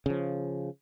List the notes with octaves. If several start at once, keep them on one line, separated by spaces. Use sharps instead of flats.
C#3 F3